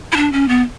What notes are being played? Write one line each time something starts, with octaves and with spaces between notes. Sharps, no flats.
E4
D4
C#4
B3